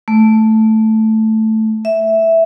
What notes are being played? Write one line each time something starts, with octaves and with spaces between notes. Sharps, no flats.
A3
E5